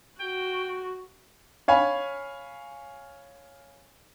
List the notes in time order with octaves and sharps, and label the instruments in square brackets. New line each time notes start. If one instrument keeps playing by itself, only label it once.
[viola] F#4 [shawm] G5
[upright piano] C#5 F5 G#5 B5